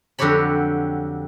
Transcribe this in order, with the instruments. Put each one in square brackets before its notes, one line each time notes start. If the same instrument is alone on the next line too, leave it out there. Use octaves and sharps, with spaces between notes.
[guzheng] F2 D3 F#3 G4 C#5 B5